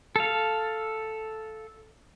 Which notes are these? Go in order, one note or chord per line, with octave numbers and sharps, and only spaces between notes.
A4 F5